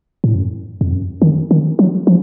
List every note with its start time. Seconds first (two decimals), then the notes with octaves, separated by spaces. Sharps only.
0.24 A2
0.35 F#2
0.81 F2
0.93 F#2
1.22 D#3
1.51 D#3
1.79 F#3
2.07 F3